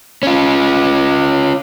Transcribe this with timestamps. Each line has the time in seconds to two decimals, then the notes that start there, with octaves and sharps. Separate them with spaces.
0.23 C#4 F4